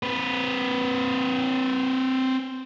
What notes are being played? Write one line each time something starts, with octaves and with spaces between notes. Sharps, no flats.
C4 B4